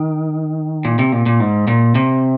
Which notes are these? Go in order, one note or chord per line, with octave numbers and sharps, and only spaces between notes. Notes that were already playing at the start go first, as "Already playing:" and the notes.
Already playing: D#3
A#2
C3
A#2
A#2
G#2
A#2
C3